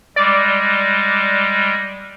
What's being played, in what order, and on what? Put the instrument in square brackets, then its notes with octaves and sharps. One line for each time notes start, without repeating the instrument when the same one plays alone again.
[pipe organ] G3 G#3 [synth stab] D5